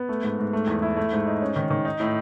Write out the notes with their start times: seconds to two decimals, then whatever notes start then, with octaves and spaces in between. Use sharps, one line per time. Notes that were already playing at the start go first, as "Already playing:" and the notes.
Already playing: B3
0.09 A3
0.23 G#2
0.39 G#2
0.53 A3
0.67 E2
0.82 E4
0.97 A3
1.12 G#2
1.27 D#4
1.42 C#4
1.56 D#3
1.71 D#3
1.85 D#4
2.00 A2